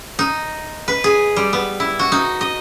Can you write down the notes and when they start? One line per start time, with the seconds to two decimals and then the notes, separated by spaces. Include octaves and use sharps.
0.19 D#4
0.88 B4
1.04 G#4
1.36 G3
1.53 B3
1.80 E4
1.99 F#4
2.12 D#4
2.41 D#5